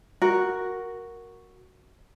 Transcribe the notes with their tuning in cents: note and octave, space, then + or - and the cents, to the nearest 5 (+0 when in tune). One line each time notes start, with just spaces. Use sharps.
F#4 +0 A#4 +0